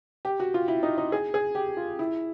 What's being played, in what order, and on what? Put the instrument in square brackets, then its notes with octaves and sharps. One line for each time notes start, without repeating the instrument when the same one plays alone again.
[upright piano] G4
F#4
F4
E4
D#4
D#4
G#4
G#4
G4
F4
E4